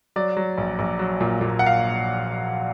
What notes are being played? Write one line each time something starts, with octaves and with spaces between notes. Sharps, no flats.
F#3 D5
F#3
A#1
A#1
F#3
A#2
A#2
F#5
F5